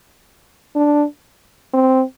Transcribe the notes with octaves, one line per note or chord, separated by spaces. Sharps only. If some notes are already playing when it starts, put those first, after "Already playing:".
D4
C4